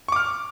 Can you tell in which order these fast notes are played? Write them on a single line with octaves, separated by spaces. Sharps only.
C#6 D6 F6